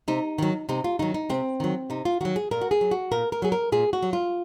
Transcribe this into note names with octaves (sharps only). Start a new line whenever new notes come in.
C3 D#4
D#3 F#3
C3 D#4
F4
D#3 F#3 D#4
D#4
C3 C4
D#3 F#3
C3 D#4
F4
D#3 F#3 F#4
G#4
A#2 A#4
F#4
G#4
F#3
F#4
A#2 A#4
A#4
F#3 G#4
A#4
A#2 G#4
F#4
F#3
F4